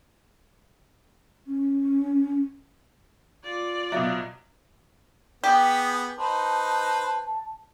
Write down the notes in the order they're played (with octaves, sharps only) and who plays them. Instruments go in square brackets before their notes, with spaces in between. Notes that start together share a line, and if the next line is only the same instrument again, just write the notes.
[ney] C#4
[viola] F4 D5
[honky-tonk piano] B2 F#3 [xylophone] E5 F5 D6
[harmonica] B3 G#4 [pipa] G4
[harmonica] D#4 B4 C5 [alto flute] A5